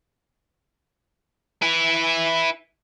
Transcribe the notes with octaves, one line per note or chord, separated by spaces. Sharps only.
E4 B4